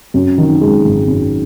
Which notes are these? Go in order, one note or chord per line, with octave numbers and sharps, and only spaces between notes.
F#2
D#3
G#3
G#1
F#2